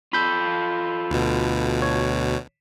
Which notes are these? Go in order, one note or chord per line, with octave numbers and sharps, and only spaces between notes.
F4 A4 B5 G6
D2 B2
C#5